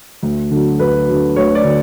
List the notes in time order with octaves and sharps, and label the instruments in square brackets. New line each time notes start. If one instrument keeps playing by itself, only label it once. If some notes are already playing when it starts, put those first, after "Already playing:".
[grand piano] D2
D3 F#3
D2 B4
D3 F#3
D2 C#5
D5
D3